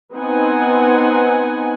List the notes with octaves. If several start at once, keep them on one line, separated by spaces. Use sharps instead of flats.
B3 C4 D#4 F#5 G#5